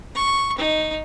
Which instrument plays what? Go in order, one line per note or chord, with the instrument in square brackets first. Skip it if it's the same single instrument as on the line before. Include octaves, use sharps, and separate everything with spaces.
[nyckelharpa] C#6
D#4